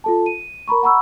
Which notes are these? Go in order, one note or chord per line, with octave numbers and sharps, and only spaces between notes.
F4 A4 A5
D#7
A#4 A#5 B5 C#6
F#5 A#5 B5 C#6 E6